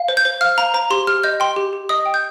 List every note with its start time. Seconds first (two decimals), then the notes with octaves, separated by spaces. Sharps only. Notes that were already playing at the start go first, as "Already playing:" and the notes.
Already playing: F5
0.08 C5
0.17 G6
0.25 C5
0.41 F5 F6
0.57 F5 A#5
0.74 C5 A#5
0.90 G4 C6
1.07 G4 F6
1.24 D#5 G6
1.40 G5 C6
1.56 G4
1.73 G4
1.89 D#5 D#6
2.05 G5
2.14 G6